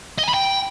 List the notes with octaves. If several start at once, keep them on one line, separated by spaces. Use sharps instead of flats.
D#5
G#5
B5
G5